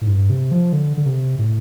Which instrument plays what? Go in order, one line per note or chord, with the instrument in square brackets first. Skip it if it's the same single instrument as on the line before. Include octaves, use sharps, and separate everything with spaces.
[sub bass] A2
G2
C3
F3
D3
D3
C3
A2